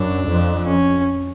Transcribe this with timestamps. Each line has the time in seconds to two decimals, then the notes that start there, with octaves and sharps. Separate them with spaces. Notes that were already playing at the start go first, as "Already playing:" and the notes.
Already playing: F#2 D4
0.28 F2
0.66 C#4